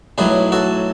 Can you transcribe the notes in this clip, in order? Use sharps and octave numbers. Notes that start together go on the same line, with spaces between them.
B1 A2 F#3 G#4 B4
F#4 A4